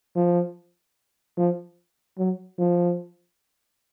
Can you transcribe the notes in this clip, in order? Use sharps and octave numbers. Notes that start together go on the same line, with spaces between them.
F3
F3
F#3
F3